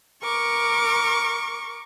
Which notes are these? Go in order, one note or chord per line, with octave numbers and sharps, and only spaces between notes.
A#4 C#6 D6